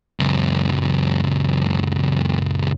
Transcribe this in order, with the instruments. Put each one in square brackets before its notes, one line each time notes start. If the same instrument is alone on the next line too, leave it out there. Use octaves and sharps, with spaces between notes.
[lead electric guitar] C#2 F#2